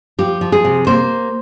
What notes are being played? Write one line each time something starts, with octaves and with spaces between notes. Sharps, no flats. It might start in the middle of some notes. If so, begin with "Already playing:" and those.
F3 G4
F3
G#4
C3
A#3 C5